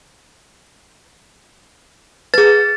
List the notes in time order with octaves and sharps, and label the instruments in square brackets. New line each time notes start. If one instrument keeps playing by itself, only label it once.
[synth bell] G#4 B4 [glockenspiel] A6